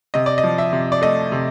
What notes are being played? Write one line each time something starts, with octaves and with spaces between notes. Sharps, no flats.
C3 D#5
D5
D#5
F3
E5
C3
D5
A3 D#5
C3